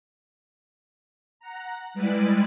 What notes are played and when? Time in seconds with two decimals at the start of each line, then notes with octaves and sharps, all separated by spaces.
1.40 F#5 A#5
1.94 G3 G#3 E4 B4 D5